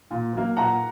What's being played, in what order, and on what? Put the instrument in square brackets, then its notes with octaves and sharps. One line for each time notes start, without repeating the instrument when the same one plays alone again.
[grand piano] A#2
F#3 A#3
[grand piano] A#2 [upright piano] F#5 A#5